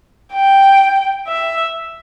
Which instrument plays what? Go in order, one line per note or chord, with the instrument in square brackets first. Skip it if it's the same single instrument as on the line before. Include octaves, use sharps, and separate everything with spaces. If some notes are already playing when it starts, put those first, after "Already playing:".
[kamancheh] G5
E5